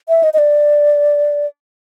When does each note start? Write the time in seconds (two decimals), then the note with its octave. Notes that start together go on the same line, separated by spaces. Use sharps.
0.09 E5
0.23 D#5
0.34 D#5
0.38 D5